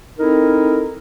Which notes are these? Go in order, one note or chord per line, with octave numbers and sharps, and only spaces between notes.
C4 D#4 E4 A4 A#4